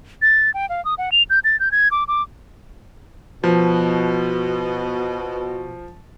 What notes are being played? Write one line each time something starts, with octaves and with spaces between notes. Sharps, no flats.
A6
G5
F5
D#6
F#5
F7
G6
A6
G6
G#6
D6
D6
B2 F3